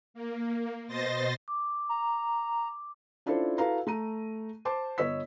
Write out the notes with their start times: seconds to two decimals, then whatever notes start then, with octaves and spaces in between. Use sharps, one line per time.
0.14 A#3
0.88 B2 C5 D#5 C6 A6 A#6
1.48 D6
1.89 A#5
3.26 C#4 D4 E4 F4 A4 C5
3.58 E4 F#4 A4 B4 F5 A#5
3.87 A3 A#5 D#7
4.65 C5 A5 D6
4.98 G1 C#5 D#5 E6 B6